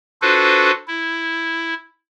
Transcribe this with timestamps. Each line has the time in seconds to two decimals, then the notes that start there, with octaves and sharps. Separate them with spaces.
0.22 D4 F4 F#4 A4 B4 C5
0.88 E4